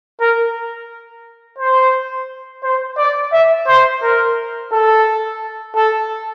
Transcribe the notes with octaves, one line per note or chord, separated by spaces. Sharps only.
A#4
C5
C5
D5
E5
C5
A#4
A4
A4